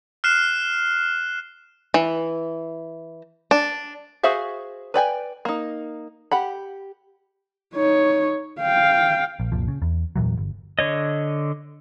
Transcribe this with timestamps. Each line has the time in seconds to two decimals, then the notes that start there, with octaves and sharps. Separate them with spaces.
0.24 F6 F#6 C7 E7
1.94 E3
3.51 D4
4.23 F#4 G#4 C5 E5 F5
4.94 B4 D5 G5 G#5
5.45 A#3 D#4
6.32 G4 F#5 B5
7.74 D#4 C#5
8.60 F5 G5
9.40 A#1
9.52 F1 C2 A#2 F3
9.68 C#3
9.82 E2
10.16 E2 A#2 E3 F#3
10.37 G1
10.79 D3 C#5 D#5